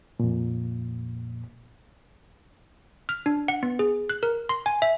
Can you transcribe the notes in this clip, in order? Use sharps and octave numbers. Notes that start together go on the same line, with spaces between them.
F2 A#2
F6
D4
F#5
B3
G#4
F#6
A#4
C6
G#5
E5